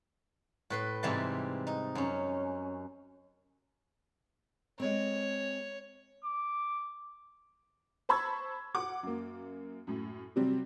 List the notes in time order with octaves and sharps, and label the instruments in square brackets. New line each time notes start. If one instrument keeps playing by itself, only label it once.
[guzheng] A2 B4 C6
G#2 C3 E3 G3 A5
D#4
F#2 C#4
[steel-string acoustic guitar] G#3 C4 [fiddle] C#5
[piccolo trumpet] D6
[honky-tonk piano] C5 A5 B5 C#6 E6 G#6
F#5 D6
F#2 A#3
F#2 A2
C3 F#3 G3 C4